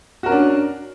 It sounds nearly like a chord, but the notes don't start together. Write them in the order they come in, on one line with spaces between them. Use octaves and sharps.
F#4 A#4 C#4 D4